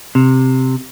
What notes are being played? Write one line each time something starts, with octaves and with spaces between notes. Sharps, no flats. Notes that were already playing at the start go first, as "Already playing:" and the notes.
C3